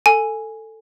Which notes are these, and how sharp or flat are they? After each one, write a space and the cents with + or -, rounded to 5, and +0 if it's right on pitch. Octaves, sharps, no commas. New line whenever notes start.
A4 +15 G#5 +0